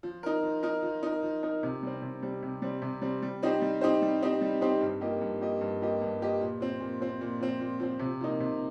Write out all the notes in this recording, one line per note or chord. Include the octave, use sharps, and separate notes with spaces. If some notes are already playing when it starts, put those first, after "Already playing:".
F3
D#4 A#4
F3
D#4 A#4
F3
D#4 A#4
F3
D#4 A#4
C3
G3 C4
C3
G3 C4
C3
G3 C4
C3
G3 C4
G3
C4 D#4 G4 C5
G3
C4 D#4 G4 C5
G3
C4 D#4 G4 C5
G3
C4 D#4 G4 C5
G2
F3 A#3 G4 D#5
G2
F3 A#3 G4 D#5
G2
F3 A#3 G4 D#5
G2
F3 A#3 G4 D#5
A#2
F3 C4
A#2
F3 C4
A#2
F3 C4
A#2
F3 C4
C3
F3 A#3 D#4
C3